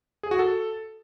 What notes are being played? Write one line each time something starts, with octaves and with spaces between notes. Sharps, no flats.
G#4
F#4
A4